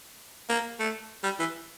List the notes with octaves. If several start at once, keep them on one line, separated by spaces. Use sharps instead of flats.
A#3
A3
G3
E3